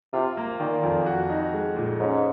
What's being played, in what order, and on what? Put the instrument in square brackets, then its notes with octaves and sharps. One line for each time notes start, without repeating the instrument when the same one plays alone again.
[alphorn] C3 [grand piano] F4
[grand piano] A#3
[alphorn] A#2 [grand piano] D#3
[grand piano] F2
F#4
D#4
G#3
A#2
[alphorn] G#2 [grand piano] C#4